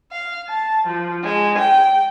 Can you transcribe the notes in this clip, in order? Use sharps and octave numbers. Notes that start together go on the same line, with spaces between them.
F5
A5
F3
G#3
G5